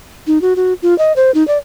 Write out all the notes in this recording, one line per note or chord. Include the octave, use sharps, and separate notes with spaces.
D#4
F#4
F#4
F4
D#5
C5
D#4
D5